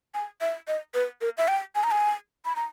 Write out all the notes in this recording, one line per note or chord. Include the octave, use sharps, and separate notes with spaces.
G#5
E5
D#5
B4
A#4
E5
G5
G#5
A#5
G#5
B5
A#5